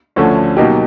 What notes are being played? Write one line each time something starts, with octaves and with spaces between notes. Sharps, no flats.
D2 D3 F3 A3 C#4
B2 F#3 A#3 D#4 G4